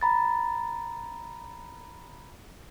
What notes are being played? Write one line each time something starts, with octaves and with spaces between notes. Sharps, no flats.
A#5 B5 A6